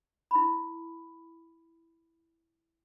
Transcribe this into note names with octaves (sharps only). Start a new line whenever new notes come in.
E4 B5